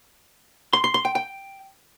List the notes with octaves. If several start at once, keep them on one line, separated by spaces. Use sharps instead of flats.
C6
C6
C6
G5
G5